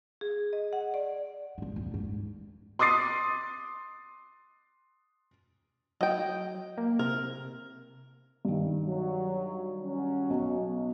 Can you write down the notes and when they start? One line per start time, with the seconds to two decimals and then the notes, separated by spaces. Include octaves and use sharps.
0.21 G#4
0.53 D#5
0.73 F#5
0.94 D5
1.58 E1 G#2
1.76 D#2 B3
1.94 G#2
2.79 C6 D6 D#6 A6 C7
6.01 F#3 D#5 G5
6.78 A#3
6.99 C3 A#4
8.45 G2 D#3
8.86 F#3
9.85 F#3 C#4
10.30 B1 B2